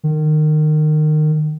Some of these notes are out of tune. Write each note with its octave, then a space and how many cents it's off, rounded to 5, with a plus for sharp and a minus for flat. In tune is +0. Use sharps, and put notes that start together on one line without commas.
D#3 -25